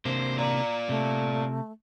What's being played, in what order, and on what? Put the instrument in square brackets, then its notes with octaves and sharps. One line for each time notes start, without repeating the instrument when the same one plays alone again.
[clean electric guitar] C3 A#3 D4 [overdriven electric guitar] C5
[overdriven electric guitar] F4 D5 [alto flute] A#5
[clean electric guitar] C3 [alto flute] A3